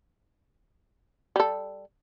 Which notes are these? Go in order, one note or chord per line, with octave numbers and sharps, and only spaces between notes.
G3 A4